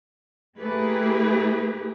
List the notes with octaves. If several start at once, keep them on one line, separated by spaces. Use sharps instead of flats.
A3 A#3 E4 G4 G#4 B4